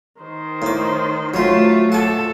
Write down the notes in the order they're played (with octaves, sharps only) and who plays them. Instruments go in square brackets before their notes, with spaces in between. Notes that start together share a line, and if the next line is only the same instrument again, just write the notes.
[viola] D#3 C5
[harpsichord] A2 D6
[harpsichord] F#3 C6 [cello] A3 F4
[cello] A4 [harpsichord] F#5 D6